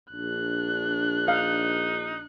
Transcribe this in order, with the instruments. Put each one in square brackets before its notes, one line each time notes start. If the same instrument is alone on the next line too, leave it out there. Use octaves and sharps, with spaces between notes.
[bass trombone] A#1 [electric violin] D4 F#6
[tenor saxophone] D#4 [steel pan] F5